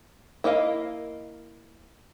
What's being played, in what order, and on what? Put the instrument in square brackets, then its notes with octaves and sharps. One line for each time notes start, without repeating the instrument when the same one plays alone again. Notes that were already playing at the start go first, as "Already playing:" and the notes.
[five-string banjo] A#3 E4 D#5 F5